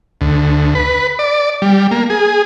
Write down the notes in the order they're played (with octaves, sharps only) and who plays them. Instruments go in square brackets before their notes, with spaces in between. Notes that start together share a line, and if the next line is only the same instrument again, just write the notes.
[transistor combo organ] D2
B4
D5
G3
A#3
G#4